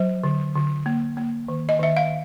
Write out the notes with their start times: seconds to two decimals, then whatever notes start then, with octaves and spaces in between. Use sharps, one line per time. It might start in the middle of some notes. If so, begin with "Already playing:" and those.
Already playing: F#3 C5
0.24 D3
0.55 D3
0.86 A#3
1.17 A#3
1.48 D#3
1.69 D#5
1.79 D#3 E5
1.97 F5